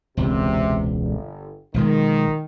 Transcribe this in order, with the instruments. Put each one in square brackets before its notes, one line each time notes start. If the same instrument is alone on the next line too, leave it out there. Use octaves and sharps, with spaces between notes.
[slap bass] E1 C#2 [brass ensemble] C3
[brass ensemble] G1
[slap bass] B1 F3 G#3 [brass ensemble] D#3